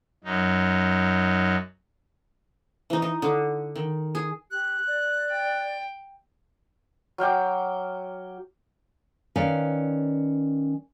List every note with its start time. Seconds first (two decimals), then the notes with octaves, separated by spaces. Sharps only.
0.24 F#2 D#4
2.90 E3 D#4
3.02 D#4
3.22 D3
3.76 D#3
4.15 G#4
4.51 G4 F#6
4.87 D5
5.31 G5
7.18 F#3 F5 G5 D6
9.36 D#3 C#4 B4 D5 F5